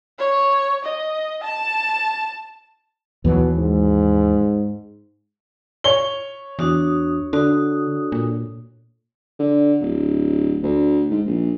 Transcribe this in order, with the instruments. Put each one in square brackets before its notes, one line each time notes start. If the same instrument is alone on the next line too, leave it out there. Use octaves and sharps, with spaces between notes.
[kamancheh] C#5
D#5
A5
[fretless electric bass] D#2 E3 F#3 [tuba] B2
[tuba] G#2
[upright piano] C#5 G7
[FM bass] E2 [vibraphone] D4 F#4 D#6
[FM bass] D3 [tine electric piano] D4 A4 [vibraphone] F#4 D#6
[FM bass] A#2
[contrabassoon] D3
D1
D2
G#2
A#1